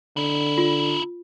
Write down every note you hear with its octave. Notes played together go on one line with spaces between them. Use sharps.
D3 D#4 E4
F4